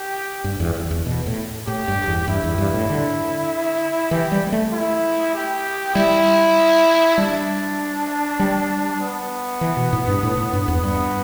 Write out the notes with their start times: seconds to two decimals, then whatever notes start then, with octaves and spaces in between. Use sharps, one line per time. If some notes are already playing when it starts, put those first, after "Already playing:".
Already playing: G4
0.44 G2
0.60 E2
0.75 E2
0.91 E2
1.06 B2
1.26 A2
1.67 A2 G4
1.88 G2
2.08 E2
2.28 G2 E4
2.44 E2
2.58 G2
2.74 A2
2.90 D3
4.11 E3 G4
4.32 G3
4.47 G3
4.52 A3
4.72 E4
5.34 G4
5.94 G3 E4
7.17 G3 D4
8.39 G3
9.01 B3
9.61 E3
9.77 B2
9.93 A2
10.07 G2
10.23 A2
10.37 A2
10.53 G2
10.68 E2
10.83 G2 B3